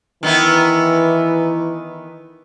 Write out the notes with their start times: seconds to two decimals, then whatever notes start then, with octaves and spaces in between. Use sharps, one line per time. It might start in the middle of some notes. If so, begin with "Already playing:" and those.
0.23 D#3 E3 B3 E4